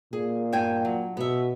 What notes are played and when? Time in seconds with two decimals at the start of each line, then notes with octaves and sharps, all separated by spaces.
0.13 A#2 G#4
0.53 G2 G5 G#5
0.85 F#3
1.17 B2 B3 E5